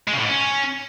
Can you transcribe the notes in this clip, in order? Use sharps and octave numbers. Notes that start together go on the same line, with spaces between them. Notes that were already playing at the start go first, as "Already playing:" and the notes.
G#3
C#3
A2
G#2
C#4